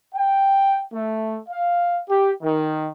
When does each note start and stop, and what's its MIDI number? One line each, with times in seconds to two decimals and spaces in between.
0.14 0.83 79
0.93 1.38 57
1.49 2.00 77
2.09 2.31 67
2.42 2.90 51